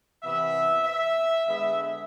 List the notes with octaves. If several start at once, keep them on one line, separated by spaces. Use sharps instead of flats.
C3 E3 B3 E5
E5
D3 G#3 B3 E5